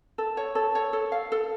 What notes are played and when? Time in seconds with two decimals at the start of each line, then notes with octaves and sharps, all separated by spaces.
0.18 A4
0.37 C#5
0.55 A4
0.75 C#5
0.93 A4
1.12 F5
1.32 A4